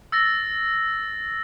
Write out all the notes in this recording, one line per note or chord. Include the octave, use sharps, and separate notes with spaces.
E6 A6 A#6